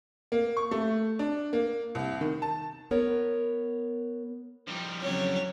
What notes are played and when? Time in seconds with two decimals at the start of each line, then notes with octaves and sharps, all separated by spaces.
0.32 A#3
0.57 C#6
0.71 A3
1.19 D4
1.53 A#3
1.95 C2
2.21 D#3
2.42 A5
2.91 B3 A#4 C#5
4.68 E3 F3 G3 D#4 G4
5.02 F2 A2 C#3 F#3 C#5